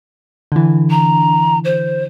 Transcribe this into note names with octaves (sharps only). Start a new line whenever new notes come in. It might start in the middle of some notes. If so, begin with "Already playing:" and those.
D3 E3
A#5
C5